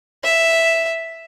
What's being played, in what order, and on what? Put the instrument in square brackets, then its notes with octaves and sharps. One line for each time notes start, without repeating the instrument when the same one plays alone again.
[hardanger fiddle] E5